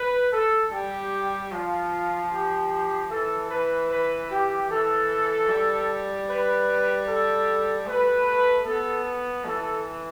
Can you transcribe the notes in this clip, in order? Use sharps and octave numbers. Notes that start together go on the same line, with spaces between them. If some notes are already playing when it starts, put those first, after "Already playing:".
Already playing: B4
A4
G3 G4
F3 F4
G4
E3 A4
B4
B4
G4
E3 A4
G3
B4
A4
A3 B4
B3 A4
E3 A4